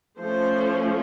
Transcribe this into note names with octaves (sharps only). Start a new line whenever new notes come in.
F3 A3 C#4 C5